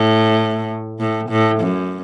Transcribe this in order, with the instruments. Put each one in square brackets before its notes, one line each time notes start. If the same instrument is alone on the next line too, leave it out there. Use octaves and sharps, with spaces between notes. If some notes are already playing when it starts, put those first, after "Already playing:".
Already playing: [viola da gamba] A2
A2
A2
F#2